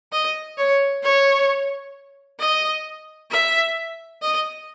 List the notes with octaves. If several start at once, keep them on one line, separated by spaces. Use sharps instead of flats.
D#5
C#5
C#5
D#5
E5
D#5